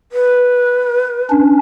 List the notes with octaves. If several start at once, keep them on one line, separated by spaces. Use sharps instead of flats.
B4
C#4 D4